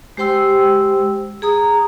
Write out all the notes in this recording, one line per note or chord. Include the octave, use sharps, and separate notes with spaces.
G#3 G4 C5 G5 C6 E6
G#4 A#5 D#6